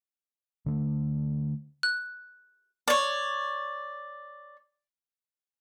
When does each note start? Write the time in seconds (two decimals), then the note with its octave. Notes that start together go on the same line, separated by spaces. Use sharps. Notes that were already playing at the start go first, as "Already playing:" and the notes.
0.66 D3 A3
1.83 F#6
2.88 C#5 D5